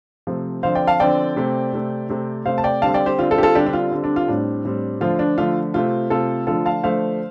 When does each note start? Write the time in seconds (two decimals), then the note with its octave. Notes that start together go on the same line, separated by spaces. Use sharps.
0.27 C3 F3 A3 C4
0.63 D3 F3 C4 C5 F5
0.75 D5 G5
0.87 F5 A5
1.00 D3 F3 C4 D5 G5
1.36 C3 A3 C4
1.73 C3 A3 C4
2.09 C3 A3 C4
2.45 C3 A3 C4 C5 F5
2.58 A5
2.64 D5 G5
2.82 D3 G3 C4 F5 A5
2.94 D5 G5
3.06 G4 C5
3.19 D3 G3 C4 F4
3.31 F4 A4
3.38 G4
3.43 F4 A4
3.55 D3 G3 C4 D4 G4
3.66 D4
3.73 F4
3.92 D3 G3 C4
4.04 D4
4.16 F4
4.28 A2 G3 C4 D4
4.65 A2 G3 C4
5.01 D3 F3 A3 F4
5.19 D4
5.38 D3 F3 A3 F4
5.74 C3 A3 C4 F4
6.10 C3 A3 C4 F4 A4
6.47 D3 F3 A3 F4 A4
6.66 F5 A5
6.83 D3 F3 A3 C5 F5